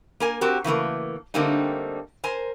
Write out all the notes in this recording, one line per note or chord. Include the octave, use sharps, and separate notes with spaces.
A#3 A#4 G#5
C4 F#4 G4 A#4
C#3 E3 A3 A#3
D3 G3 A3 A#3 C4 D#4
A#4 C5 G#5